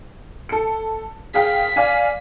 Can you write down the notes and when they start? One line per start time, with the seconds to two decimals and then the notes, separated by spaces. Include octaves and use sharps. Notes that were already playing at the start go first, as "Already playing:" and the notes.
0.49 A4 C#7
1.34 G#4 F5 G5 B6
1.76 D5 F5 G#5